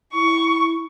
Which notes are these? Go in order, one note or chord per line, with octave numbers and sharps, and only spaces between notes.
E4 C#6